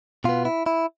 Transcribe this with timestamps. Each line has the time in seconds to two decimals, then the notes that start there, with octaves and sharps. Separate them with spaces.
0.24 B2 B3 F4
0.45 E4
0.66 E4